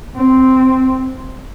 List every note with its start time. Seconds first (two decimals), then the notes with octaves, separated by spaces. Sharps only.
0.17 C4